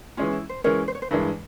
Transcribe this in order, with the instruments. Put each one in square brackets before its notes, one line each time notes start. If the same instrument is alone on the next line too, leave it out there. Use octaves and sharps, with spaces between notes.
[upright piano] E3 G#3 C#4 [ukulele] F4
[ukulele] E4
C5
[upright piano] E3 G#3 C#4 [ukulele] A#4 C#5
[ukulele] C5
C#5
C5
[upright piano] G2 E3 G#3 [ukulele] A#4